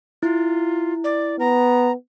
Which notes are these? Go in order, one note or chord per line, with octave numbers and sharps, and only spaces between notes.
E4 F4
D5
B3 A#5